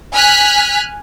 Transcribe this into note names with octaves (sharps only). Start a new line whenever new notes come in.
G#5 F6 F#6 B6